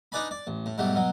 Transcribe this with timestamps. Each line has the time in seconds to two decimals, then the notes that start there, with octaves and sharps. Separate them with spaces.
0.12 D4 D#4 B4 D5 G#5 B5
0.31 D5
0.47 A1
0.66 A2
0.78 G#2 B2 F#3 G3 A3
0.95 B2 F#3